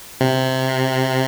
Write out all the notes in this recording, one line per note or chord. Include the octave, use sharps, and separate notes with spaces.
C3